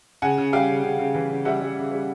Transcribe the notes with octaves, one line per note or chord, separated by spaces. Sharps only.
C#3 F#5 G#5
C#3
G3 F5 G5
C#3
C#3
C#3
E3
C#3
G3 E5 F#5
G3
C#3
G3